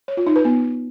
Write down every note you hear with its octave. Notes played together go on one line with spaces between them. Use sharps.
C#5
F4
D#4
B4
B3